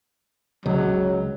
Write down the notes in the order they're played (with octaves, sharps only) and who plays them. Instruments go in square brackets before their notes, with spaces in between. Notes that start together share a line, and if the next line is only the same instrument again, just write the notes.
[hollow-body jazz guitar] C#2 [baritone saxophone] F#3